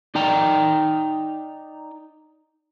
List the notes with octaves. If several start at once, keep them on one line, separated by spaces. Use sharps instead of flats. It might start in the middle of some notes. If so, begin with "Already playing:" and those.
D#4 D5 G5 A#5